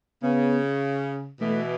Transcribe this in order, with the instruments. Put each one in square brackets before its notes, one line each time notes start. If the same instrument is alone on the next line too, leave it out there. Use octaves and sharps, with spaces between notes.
[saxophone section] C#3 [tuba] B3
[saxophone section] B2 E3 [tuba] A3